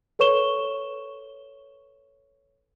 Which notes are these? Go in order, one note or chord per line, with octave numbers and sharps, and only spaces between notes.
A4 B4 C#5 C#6 E7 G7